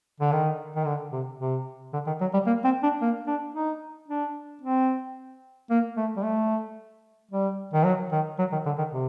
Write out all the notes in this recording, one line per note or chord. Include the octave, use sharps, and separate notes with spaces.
D3
D#3
D#3
D3
C3
C3
D3
D#3
F#3
G3
A#3
C4
D4
A#3
D4
D#4
D4
C4
A#3
A3
G3
A3
G3
D#3
F#3
D#3
F#3
D#3
D3
D#3
C3